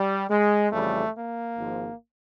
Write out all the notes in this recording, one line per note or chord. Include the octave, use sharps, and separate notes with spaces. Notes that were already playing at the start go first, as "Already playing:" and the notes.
Already playing: G3
G#3
F2 C#3 E3 G3 A3
A#3
G#1 G#2 F3